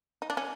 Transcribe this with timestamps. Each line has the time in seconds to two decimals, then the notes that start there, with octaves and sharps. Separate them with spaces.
0.22 D#4
0.30 D4
0.37 C#4